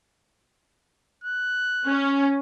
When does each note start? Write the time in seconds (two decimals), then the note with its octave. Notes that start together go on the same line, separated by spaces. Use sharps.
1.24 F#6
1.85 C#4